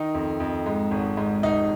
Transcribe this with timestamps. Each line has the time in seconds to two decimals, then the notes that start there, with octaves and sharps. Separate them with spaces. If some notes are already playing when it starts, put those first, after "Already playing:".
Already playing: D#3 D#4
0.14 F2
0.40 F2
0.66 G#2
0.91 G#1
1.17 G#2
1.43 F1 D#4